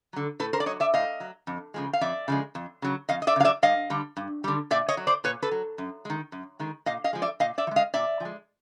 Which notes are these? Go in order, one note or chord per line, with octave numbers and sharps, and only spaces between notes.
D3 F#3
A2 A4 B4
A#4 C5
D5
F#3 C#5 D#5
D5 E5
A2 D#5 F5
F#3
F2
C#3 F3 G#3
F5
F2 D5 E5
C#3 F3 G#3
F2
C#3 F#3
F2 D#5 F5
D#5
D5 E5
C#3 F#3 F5
D5 E5
G2 D#5 F5
D3 G3
G2
D3 G3
A#2 D5 E5
C#5 D#5
F#3
C5 D5
A#2 B4 C#5
A4 B4
F#3
F#2
D#3 G#3
F#2
D#3 G#3
A#2 D#5 F5
D#5 F5
F3 G#3
D5 E5
A#2 D#5 F5
D5 E5
F3
G#3 D#5 F5
A#2 D5 E5
F3 G#3